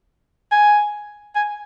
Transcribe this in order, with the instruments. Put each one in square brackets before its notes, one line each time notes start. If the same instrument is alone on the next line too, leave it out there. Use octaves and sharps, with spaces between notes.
[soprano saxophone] G#5
G#5